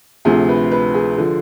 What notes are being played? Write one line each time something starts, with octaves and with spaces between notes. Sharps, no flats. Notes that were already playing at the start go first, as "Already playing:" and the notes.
D2 C3 F3 G#4
B4
B4
G#4
D3 F3